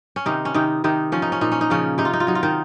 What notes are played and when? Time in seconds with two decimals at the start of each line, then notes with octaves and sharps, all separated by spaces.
0.16 C#4
0.26 C3 D#3 D#4
0.45 C#4
0.54 C3 D#3 D#4
0.84 C3 D#3 D#4
1.12 F3 C#4
1.22 D#4
1.32 C#4
1.41 A#2 D#4
1.52 C#4
1.61 D#4
1.70 C#3 F3 C#4
1.98 C3 D#4
2.05 F4
2.13 D#4
2.20 F4
2.27 F#3 D#4
2.35 F4
2.43 D#3 D#4